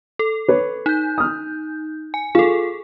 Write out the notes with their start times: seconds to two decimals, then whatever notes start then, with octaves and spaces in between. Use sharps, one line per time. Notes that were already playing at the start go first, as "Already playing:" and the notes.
0.19 A4
0.48 B4 C#5
0.86 D#4 G6
1.18 D#6 F6
2.14 G#5
2.35 F4 G#4 A4